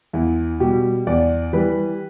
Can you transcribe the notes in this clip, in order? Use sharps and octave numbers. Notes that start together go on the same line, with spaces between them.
E2 E4
B2 G3 G4
E2 D5
E3 G3 B4